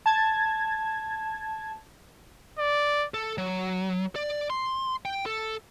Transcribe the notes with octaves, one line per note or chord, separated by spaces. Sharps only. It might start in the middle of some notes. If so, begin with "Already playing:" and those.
A5 G#6
D5
A4
F#3
D5
C6
G5
A4